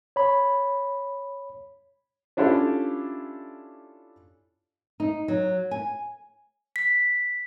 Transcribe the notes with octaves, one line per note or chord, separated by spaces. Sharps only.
C#5 B5
C#4 D4 E4 F4 G4 A4
D#4
F#3
G#5
B6